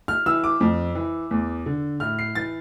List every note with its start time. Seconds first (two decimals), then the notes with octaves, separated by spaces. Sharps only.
0.08 F6
0.26 E3 E6
0.44 D6
0.61 F2
0.95 E3
1.31 E2
1.66 D3
2.00 A2 F6
2.19 C7
2.35 E3 A6